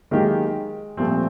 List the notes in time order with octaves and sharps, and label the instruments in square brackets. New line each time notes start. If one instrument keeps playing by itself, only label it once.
[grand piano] D#3 F#3 A#3 D#4 G4 [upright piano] G#3
[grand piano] A#2 F3 A3 C4 [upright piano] G3